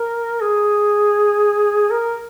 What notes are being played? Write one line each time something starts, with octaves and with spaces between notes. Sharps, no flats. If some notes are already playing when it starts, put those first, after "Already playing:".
Already playing: A#4
G#4
A#4